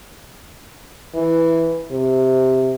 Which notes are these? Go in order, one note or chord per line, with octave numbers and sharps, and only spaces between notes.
E3
C3